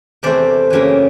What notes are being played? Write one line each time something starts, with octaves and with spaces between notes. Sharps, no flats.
E2 C3 E3 A3 C4 C5 D5
F#2 C#3 E3 G3 A#3